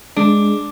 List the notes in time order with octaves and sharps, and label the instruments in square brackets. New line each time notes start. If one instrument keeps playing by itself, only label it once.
[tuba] G#3 [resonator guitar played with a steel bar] D4